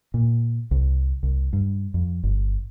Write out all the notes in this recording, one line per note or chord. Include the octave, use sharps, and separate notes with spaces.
A#2
C2
C2
G2
F2
G1